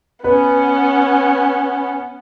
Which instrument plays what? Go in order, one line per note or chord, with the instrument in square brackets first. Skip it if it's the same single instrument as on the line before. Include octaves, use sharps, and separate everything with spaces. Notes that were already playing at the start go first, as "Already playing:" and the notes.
[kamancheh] B3 C#4 [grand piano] B4